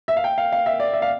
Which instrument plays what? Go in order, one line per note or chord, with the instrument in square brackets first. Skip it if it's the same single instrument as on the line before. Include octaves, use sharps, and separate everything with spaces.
[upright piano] E5
F5
G5
F5
F5
E5
D5
E5
F5